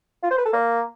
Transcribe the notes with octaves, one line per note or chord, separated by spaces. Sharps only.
F4
C5
B4
A4
A#3